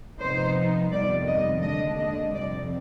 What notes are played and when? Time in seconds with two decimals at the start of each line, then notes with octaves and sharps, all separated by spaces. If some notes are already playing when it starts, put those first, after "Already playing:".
0.20 C3 F3 B3 D#4 C5
0.92 F2 C3 D#3 G3 B3 D5
1.27 D#5
1.63 D#2 D3 G#3 D4 D#5
1.98 D#5
2.35 F2 C3 G3 C4 D5